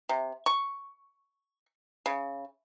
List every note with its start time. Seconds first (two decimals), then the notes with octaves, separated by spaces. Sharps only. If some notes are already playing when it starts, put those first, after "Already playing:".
0.09 C3
0.46 C#6
2.06 C#3